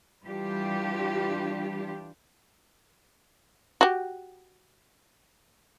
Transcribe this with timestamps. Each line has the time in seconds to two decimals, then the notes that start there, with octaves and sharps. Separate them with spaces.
0.24 E3 G3 D4 F4 G4
3.81 F#4 G4